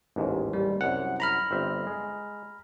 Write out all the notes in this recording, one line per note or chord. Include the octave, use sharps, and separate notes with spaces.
A1 D#2 G#2
G3
C2 F#2 F#5
A#5 B5 F6
G1 C4 E5
G#3